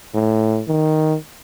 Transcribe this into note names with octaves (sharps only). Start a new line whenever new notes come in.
A2
D#3